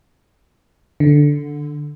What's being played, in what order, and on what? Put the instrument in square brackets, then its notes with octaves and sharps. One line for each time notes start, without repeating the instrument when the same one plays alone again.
[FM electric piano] D3